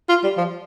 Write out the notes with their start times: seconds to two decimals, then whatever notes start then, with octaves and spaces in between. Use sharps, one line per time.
0.09 F4
0.23 G3
0.37 F3